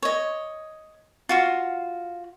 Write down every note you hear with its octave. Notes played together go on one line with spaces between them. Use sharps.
C#5 D#5
F4 F#4 F5